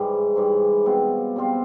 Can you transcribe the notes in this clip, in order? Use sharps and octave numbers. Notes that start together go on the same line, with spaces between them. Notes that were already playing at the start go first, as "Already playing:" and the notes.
Already playing: G#2 E3 G3
G#2 E3 G3
B2 G3 C4 F4
B2 G3 C4 F4